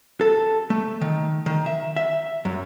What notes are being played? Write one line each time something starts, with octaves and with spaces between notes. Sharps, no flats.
A4
A3
D#3
D#3
E5
E5
F#2